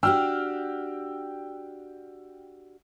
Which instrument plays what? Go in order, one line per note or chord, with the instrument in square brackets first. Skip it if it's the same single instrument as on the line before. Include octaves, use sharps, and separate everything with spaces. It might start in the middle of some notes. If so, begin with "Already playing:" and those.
[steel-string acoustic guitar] D4 F#4 G4 [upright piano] G5 E6 F6